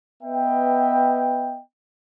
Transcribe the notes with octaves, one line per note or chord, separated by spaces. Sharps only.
B3 B4 D#5 E5 G5